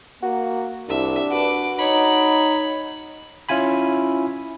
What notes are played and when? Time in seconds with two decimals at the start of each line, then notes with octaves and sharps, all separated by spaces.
0.23 A#3 F#4
0.89 C2 D4 E5
1.31 F#4 B4 D6
1.79 D#4 C#5 B5
3.49 C#4 E4 F4 G#5 B5